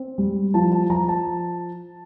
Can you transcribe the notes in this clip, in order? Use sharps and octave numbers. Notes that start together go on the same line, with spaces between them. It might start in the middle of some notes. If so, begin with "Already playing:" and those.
Already playing: C4
G3
F3 A5
A5
F3 A#5
A5